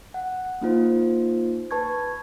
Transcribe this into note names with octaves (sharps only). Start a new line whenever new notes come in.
F#5
A#3 D#4 F4 C5
B4 A5 C#6 G#6